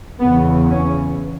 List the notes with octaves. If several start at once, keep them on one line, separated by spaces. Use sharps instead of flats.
E2 C#3 B3
C#4